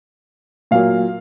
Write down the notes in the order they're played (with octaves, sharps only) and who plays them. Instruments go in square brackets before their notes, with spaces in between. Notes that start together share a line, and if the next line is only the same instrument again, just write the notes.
[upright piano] A#2 F#3 A#3 F5